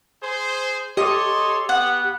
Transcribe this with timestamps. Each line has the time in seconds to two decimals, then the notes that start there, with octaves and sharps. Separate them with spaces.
0.22 G#4 C5
0.97 G4 A4 C#5 D#5 C6 D6
1.69 B3 F#5